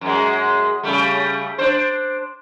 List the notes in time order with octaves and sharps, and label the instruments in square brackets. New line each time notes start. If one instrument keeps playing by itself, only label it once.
[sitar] F#2 G#3
C#3 G3 A3
D4 C5